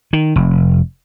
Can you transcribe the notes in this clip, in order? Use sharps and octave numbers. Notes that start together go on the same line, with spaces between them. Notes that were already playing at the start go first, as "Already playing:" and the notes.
D#3
F1